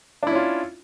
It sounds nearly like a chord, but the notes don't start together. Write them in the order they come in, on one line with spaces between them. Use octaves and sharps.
D4 E4 C#4 F4